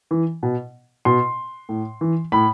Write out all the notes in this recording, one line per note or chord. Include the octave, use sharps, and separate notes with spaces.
E3
B2
B2 C6
A2
E3
A2 B5